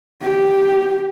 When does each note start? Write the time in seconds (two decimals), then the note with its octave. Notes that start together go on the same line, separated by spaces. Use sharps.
0.22 G4